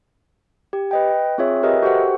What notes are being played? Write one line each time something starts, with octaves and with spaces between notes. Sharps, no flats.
G4
B4 D#5 G5
C4 F4 G#4 C#5 E5
G4 A#4 B4 D#5 E5
F#4 G4 A4 C5 F#5